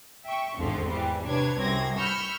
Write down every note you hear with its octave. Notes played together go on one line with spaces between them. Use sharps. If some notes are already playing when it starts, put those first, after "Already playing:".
E5 G5 C#6
G#1 E2 D3 F3 C4
E3 G3
C3 D4 B4 C#5 G#6
C2 F#2 C4 G#6 A#6
B5 C#6 E6 F6 G6 C#7